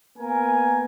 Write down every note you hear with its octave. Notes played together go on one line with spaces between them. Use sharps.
A#3 B3 A#4 G#5